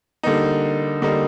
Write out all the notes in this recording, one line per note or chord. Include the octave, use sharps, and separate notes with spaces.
D3 G3 A#3 D#4
D3 G3 A#3 D#4